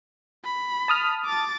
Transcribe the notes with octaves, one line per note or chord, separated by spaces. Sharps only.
B5
A5 D#6 F6
D6 A6